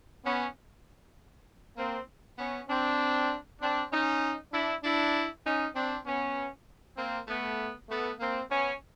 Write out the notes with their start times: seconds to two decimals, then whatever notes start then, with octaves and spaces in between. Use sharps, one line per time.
0.24 B3 C#4
1.77 A#3 C4
2.39 B3 C#4
2.69 C4 D4
3.61 C4 D4
3.91 C#4 D#4
4.53 D4 E4
4.83 D4 E4
5.45 C#4 D#4
5.75 C4 D4
6.06 B3 C#4
6.97 A#3 C4
7.28 A3 B3
7.89 A3 B3
8.19 A#3 C4
8.50 B3 C#4